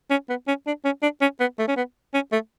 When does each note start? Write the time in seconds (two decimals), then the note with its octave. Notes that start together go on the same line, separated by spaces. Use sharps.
0.10 C#4
0.29 B3
0.48 C#4
0.67 D4
0.85 C#4
1.02 D4
1.21 C#4
1.40 B3
1.59 A3
1.68 C#4
1.77 B3
2.14 C#4
2.32 A3